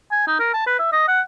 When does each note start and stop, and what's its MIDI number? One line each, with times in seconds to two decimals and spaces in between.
0.11 0.25 80
0.27 0.35 63
0.39 0.50 70
0.53 0.65 81
0.67 0.76 71
0.79 0.89 76
0.92 1.06 75
1.08 1.21 78